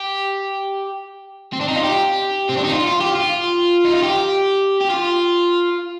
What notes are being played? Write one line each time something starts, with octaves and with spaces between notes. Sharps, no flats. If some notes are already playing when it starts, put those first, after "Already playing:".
Already playing: G4
C4
D4
D#4
F4
G4
C4
D4
D#4
F4
F4
G4
F4
D#4
F4
G4
G4
F4